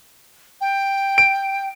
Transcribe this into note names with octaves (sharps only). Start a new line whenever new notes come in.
G5
D7